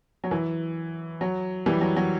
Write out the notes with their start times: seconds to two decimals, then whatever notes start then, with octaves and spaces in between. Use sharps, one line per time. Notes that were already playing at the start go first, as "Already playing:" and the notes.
0.24 F#3
0.31 E3
1.21 F#3
1.66 E3 G3
1.81 F#3
1.96 F#3